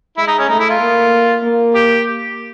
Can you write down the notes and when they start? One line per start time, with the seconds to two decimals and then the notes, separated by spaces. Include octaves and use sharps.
0.18 G#3 E4
0.28 D#4
0.38 C#4
0.49 A3 D#4
0.59 E4
0.70 F4
0.80 A#3
1.43 A#3
1.75 G4